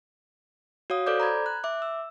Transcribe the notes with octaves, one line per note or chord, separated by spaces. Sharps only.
F#4 C#5 F5 D#6
A4 C5 D5 D6 G6
A#5 B5 G#6
F#6
E5 D6
E6